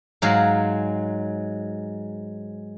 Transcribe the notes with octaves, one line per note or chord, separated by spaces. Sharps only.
G#2 F#3 G#3 F5